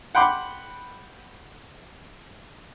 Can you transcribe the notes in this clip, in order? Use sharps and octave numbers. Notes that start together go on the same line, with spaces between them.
F#5 G5 B5 C6 D6